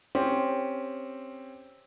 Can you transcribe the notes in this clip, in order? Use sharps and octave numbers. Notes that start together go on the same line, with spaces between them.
C4 C#4 G4